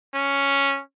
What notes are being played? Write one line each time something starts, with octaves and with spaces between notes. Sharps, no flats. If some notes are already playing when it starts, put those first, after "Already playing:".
C#4